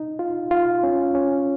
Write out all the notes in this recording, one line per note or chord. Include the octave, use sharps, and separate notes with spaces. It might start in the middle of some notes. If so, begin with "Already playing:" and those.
Already playing: D#4
F4
F4
C#4
C#4